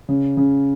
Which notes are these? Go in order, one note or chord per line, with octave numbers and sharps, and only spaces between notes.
C#3
C#3